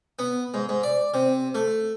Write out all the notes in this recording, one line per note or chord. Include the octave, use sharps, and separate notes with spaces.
B3
G#2
G#2
D5
C3
A3